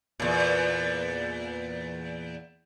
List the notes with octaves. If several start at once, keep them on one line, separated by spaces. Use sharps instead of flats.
E2 A#2